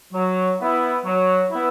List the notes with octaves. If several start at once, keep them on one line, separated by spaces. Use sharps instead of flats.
F#3
B3 E4
F#3
B3 E4